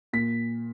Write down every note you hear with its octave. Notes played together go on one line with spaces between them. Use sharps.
A#2 B6